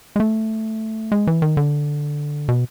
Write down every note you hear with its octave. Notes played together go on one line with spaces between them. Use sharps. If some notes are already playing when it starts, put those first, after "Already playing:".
G#3
A3
G#3
E3
D#3
D3
B2